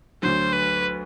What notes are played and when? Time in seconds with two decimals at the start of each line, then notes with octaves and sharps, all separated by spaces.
0.22 D2 D3 F#3 C5
0.53 B4